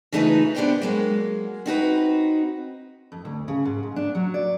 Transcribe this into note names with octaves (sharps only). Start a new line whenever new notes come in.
C#3 E3 A3 D#4 F4 B4
B3 D4 F4 G4 A4 C5
F#3 G#3 A#3
C4 D#4 F#4 B4
F2
D2
C#3
G#2
G#2
D4
F#3
D5